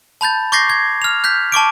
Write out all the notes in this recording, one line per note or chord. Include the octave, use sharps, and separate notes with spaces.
A5 B5 G6 A6
C#6 D6 G6 A6 A#6 C7
G#6
F6 F7
F#6 G6 B6
A5 C#6 D6 D7